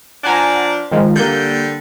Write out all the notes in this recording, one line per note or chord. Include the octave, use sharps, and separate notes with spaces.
F3 D4 F#5 G#5 A#5
D#3 F3 G#3
D3 G3 A#3 G6